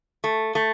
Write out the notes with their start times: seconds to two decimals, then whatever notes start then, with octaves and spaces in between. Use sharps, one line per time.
0.24 A3
0.55 A3